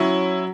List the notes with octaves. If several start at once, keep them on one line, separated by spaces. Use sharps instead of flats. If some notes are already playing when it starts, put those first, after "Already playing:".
Already playing: F#3 C#4 E4